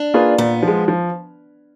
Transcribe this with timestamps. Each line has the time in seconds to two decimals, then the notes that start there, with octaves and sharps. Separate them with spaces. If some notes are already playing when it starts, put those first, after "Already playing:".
Already playing: D4
0.14 A#3 F4 G#4 B4
0.38 A#2 B3
0.63 F3 G#3
0.88 F3